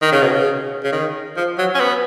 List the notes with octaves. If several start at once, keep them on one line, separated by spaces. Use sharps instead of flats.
D#3
C#3
B2
C#3
C#3
D#3
F3
F#3
C#4
B3